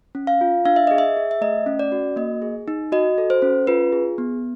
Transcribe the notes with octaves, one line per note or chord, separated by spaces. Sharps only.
C#4
F5
F4
D4 F5
E5
G#4 D#5
E5
G#4
E5
A3 D#5
C#4
D5
F#4
A#3 D#5
G#4
D#4
F#4 D#5
A4
C5
C#4
F4 B4
G#4
B3